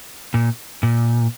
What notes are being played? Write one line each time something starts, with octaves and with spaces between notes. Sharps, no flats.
A#2
A#2